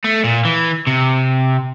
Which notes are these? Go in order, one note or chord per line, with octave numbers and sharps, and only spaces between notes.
A3
A#2
E3
C3